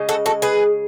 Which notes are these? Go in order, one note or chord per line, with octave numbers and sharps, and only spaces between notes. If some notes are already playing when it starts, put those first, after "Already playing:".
Already playing: C#3 G#3
F#4 A4
F#4 A4
G#4 B4